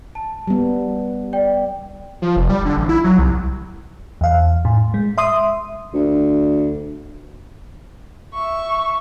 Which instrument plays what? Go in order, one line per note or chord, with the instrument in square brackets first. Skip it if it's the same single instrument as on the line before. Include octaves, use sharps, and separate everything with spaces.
[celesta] A5
[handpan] G3 B3
[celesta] D5 G5
[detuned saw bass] F3
F1
G3
D3
A1
E4
F#3
C2
[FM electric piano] E2 F5
A2
G#3
E5 C6 D#6
[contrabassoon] D2
[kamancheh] E5 C#6